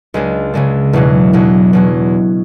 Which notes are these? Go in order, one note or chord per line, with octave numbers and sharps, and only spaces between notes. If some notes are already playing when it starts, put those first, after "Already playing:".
C#2 C#3 G#3 D4
C#2 C#3 G#3 D4
E2 B2 F#3
E2 B2 F#3
E2 B2 F#3